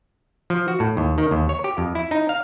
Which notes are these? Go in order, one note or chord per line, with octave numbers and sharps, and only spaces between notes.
F3
F#4
A2
D#2
D#3
D#2
C#5
G4
F2
E4
D#4
F5